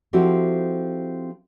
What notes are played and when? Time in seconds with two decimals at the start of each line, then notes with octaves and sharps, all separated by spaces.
0.13 F3 C4 E4 F#4 G4 A4